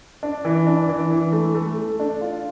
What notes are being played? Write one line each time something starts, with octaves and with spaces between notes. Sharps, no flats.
D4
E3
D4
E3
E3
A3
A3
A3
D4
F4